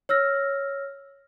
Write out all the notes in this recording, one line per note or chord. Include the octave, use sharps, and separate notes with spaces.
C#5 E6 F6 A#6